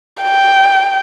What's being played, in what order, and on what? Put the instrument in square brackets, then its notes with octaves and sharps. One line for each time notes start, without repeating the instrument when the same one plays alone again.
[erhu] G5